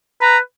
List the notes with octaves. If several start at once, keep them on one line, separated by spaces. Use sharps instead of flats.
B4 A#5